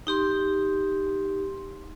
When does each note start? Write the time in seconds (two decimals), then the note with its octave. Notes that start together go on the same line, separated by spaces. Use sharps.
0.07 D#4 G4 C6